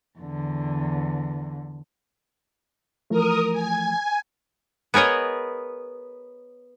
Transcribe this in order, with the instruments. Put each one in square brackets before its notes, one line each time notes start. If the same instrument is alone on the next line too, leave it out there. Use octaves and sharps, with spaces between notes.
[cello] E2 D3
[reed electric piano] E3 F3 A3 [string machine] A#4 D#6
[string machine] G#5
[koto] B3 G#4 A#4 C#5 D#5